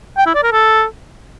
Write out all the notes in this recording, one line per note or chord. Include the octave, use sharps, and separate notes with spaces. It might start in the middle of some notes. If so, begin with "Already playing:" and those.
G5
E4
D5
A#4
A4